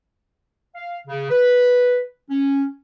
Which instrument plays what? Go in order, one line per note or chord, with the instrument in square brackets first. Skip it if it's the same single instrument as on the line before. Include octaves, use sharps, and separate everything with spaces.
[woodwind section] F5
C#3
B4
C#4